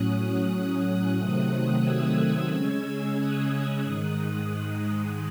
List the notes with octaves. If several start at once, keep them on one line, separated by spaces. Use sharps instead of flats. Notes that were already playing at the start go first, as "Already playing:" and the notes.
Already playing: A2 F#3 C#4 D#6 F#6
D#6 F#6
C3 D#3 F#3 A3 C4
E6 G#6
C#3 G#3 C#4
D#6 F#6
G#2 D#3 G#3 D#6 F#6
D#6 F#6